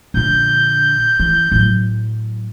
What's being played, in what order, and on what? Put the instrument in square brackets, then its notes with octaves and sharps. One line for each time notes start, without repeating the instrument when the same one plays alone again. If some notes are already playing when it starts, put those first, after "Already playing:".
[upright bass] A#1 D3 [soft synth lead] G6
[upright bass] E3
A2 F#3